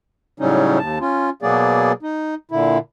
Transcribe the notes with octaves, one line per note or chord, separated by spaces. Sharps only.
A2 C#3 F#3 G3 C#4 D#4
D#2 A5
C#4 F4
B2 F#3 A#3 B3 G#4 D5
D#4
A#2 D3 E4